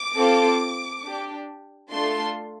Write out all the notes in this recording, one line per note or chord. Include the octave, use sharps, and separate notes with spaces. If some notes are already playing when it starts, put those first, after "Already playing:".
Already playing: D6
C4 F4 A4
D4 G4
A3 D4 F4 A4 C6